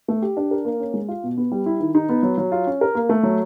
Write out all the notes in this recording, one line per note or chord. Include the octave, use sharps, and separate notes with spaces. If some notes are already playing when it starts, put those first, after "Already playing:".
A3
G4
D4
A#4
A#3
C#4
G#3
F4
B2
B3
G3
E4
D#3
D#4
B3
F#3
F#3
F4
C#4
A#4
A#3
A3
F#3